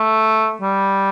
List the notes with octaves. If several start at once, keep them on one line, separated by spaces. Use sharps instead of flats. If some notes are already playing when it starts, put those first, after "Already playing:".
Already playing: A3
G3